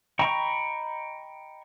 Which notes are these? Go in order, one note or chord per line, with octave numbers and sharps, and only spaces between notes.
D#5 G5 A#5 B5 C#6